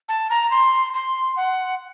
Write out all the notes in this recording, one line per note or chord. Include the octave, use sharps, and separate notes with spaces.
A5
A#5
C6
C6
F#5